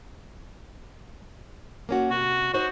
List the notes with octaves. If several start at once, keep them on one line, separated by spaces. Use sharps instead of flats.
A#3 C#4 F#4
C3 F#4
D#4 F#4 C5 C#5